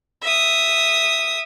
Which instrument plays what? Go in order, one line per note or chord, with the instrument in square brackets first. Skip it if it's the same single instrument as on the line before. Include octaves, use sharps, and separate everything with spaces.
[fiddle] E5 D#6